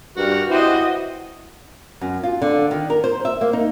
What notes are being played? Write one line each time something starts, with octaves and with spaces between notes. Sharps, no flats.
G2 F#4 G4 A#4
E4 F#4 G4 B4 C5 D#5
F#2
F4
D3
D#3
A#4
C5
E5
A#3
D#4